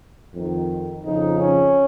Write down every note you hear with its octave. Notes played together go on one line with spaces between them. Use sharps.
F2 D#3
F2 C#3 F3 D#4
C#4